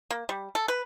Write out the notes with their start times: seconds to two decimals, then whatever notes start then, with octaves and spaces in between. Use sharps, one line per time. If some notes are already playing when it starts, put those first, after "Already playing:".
0.11 A#3
0.29 G3
0.55 A4
0.68 B4